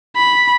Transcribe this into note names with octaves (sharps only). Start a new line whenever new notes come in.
B5